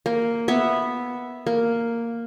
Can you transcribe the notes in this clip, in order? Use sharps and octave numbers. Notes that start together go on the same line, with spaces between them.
A#3
B3 E5
A#3